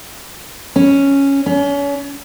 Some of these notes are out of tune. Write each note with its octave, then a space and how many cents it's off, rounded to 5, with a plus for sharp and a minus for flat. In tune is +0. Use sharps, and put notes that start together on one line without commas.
C#4 +0
C#4 +35